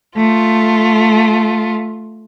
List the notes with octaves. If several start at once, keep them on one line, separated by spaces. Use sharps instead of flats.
A3 F4